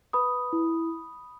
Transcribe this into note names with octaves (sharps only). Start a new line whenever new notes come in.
B4 B5 D#6
E4